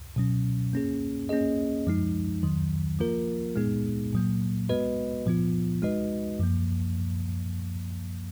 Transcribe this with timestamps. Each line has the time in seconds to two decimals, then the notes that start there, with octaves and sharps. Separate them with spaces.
0.16 B2 F#3 C#4
0.73 A#3 C#4 G#4
1.29 A#3 C#4 G#4 D#5
1.87 F#2 F3 G#3 D#4
2.43 F2 D#3 F#3
2.99 F3 A#3 F4 A#4
3.56 A#2 G#3 B3 D#4 G#4
4.13 A#2 F#3 A#3
4.69 G#3 B3 F#4 B4 D#5
5.26 A#2 F3 B3 F4
5.82 G#3 D#4 F#4 B4 D#5
6.39 F#2 F3 A#3